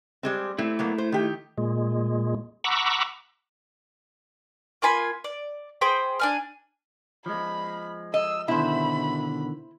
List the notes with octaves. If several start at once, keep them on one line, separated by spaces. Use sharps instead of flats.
G3 G#3 C4
A3 C4 E4
F#3 A#3 B3
C5
D#3 G4
A#2 G#3
F#5 A#5 B5 C#6 D6 E6
A#3 F4 G#5 B5
D5
G#4 C5 G5 B5
D4 G#5 F6
F3 G#3 B5
D#5 E6
B2 D3 D#3 E4 C5 B5